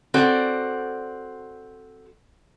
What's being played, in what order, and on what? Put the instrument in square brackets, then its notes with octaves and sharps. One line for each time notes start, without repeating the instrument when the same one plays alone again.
[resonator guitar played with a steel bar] C4 F#4 A4 D5